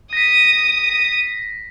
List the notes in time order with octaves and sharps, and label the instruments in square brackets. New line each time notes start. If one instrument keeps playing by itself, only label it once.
[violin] D#6 [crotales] A#6 B6